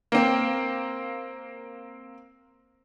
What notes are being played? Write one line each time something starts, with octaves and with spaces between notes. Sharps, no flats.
A#3 C4